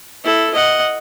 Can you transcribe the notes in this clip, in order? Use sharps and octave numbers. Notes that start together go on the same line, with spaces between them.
E4 A4
D#5 F#5